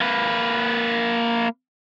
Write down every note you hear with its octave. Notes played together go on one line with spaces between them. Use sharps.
A#3 B4